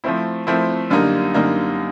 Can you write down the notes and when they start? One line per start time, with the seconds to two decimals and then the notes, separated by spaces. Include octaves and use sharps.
0.04 F3 A3 C4 E4
0.47 F3 A3 C4 E4
0.90 F#2 D3 G3 A#3 D#4
1.34 F#2 D3 G3 A#3 D#4